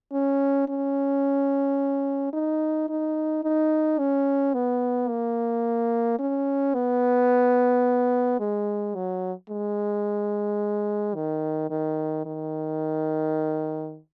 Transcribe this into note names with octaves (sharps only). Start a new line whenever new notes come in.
C#4
C#4
D#4
D#4
D#4
C#4
B3
A#3
C#4
B3
G#3
F#3
G#3
D#3
D#3
D#3